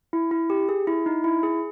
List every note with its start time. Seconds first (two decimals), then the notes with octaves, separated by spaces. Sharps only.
0.13 E4
0.31 E4
0.50 G4
0.69 G#4
0.87 E4
1.06 D#4
1.24 E4
1.43 G#4